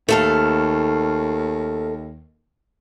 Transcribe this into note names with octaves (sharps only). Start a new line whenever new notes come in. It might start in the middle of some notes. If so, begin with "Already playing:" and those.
D#2 A3 A4 F5